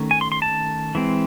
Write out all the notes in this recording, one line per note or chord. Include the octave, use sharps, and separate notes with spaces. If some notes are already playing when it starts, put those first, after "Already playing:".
Already playing: D#3 A3 C#4
G#5
C6
C6
A5
E3 G#3 C4